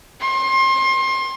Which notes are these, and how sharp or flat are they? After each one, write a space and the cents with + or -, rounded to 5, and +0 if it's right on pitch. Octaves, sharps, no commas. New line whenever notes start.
C6 +30